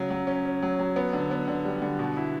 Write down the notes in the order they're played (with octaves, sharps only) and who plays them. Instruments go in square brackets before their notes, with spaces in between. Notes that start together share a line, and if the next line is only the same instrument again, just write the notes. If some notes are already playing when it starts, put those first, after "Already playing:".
Already playing: [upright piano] C#3 F#3
F#3
C#4
C#4
F#3
F#3
B3
D3
B3
D3
G3
D3
B2
E4